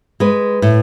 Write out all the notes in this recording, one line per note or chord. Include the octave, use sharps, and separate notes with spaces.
G#3 B4
A2